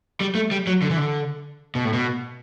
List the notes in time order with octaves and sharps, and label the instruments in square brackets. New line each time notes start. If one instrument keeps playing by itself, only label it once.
[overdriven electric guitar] G3
A3
G3
F#3
D3
E3
D3
B2
A2
B2